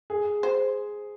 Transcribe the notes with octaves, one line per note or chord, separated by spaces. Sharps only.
G#4
C5